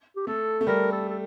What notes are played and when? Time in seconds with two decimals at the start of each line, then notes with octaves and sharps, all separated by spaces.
0.16 G4
0.27 A3 A4
0.61 A3
0.67 G3 A#4
0.92 A4
1.09 A4